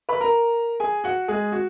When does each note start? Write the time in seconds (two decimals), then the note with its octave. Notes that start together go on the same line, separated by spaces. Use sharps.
0.09 B4 B5
0.20 A#4 A#5
0.80 G#4 G#5
1.04 F#4 F#5
1.28 G#3 G#4
1.52 F#4